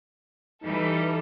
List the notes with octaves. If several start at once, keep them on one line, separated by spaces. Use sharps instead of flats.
E3 G3 D#4 A4